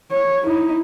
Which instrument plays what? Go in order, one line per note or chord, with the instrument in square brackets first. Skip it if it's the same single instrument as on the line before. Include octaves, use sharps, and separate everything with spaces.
[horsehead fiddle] C#5
D#4 E4